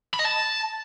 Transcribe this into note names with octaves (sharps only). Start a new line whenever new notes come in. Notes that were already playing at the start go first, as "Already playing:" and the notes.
B5
D#5
A5